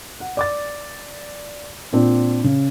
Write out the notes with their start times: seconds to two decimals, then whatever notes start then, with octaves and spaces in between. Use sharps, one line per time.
0.20 F#5
0.37 D5 D6 A6
1.93 A#2 C4 D4 F4
2.44 C#3